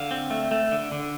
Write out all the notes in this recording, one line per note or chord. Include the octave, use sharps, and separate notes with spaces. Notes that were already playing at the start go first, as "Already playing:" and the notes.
Already playing: D3 F5
C4
A3
A3
D3
D3